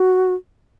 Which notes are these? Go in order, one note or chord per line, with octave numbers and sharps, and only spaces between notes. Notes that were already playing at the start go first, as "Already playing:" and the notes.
Already playing: F#4